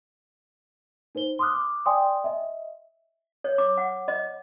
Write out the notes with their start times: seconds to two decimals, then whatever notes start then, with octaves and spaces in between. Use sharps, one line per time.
1.15 D#4 B4 C5 G7
1.39 C6 D6 D#6 F6 F#6
1.54 D6
1.86 D5 G5 G#5 C6 D#6
2.24 D#5 E5
3.44 C#5
3.58 D6
3.78 F#5
4.08 D#5